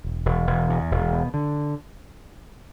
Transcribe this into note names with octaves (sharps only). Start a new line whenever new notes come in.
E1
E1
E1
E2
E1
B2
D3